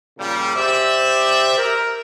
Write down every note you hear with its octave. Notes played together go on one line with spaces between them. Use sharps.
A#2 C#3 F3 G3
G4 C5 D5 E5
A#4